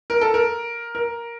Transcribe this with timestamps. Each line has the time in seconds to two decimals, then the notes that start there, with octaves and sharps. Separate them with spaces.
0.10 A#4
0.21 A4
0.34 A#4
0.95 A#4